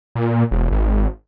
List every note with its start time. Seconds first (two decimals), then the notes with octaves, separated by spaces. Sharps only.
0.15 A#2
0.51 E1
0.71 G#1